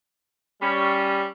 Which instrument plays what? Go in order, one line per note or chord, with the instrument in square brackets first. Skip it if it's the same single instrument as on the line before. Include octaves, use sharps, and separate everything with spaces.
[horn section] G3 C#4